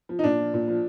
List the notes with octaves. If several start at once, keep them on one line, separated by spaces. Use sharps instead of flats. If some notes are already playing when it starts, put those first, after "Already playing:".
F3
D#4
A#2 D4
F3
A#2
F3